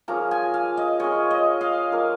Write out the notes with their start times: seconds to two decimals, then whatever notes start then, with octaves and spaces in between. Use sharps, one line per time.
0.08 F3 A#3 C#4 G#4 A#5
0.31 G#5
0.54 F5
0.77 D#5
1.00 G#3 C#4 F4 C#5
1.31 D#5
1.61 F5
1.92 F3 A#3 F4 A#4